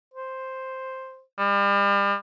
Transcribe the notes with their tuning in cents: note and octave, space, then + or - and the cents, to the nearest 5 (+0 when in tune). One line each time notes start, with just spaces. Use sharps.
C5 +5
G3 +40